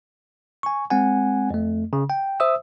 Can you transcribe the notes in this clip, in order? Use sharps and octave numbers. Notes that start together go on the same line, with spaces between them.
G#5 C#6
G#3 C4 F#5 G#5
F2 A3
C#3
G5
C5 E5 D#6 E6